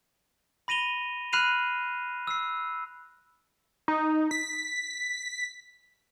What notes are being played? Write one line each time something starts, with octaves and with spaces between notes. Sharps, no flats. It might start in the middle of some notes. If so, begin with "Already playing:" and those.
B5 A#6 D#7 F7 G7
B5 F6 F#6 C7 D#7 F7
E6 C7
D#4
B6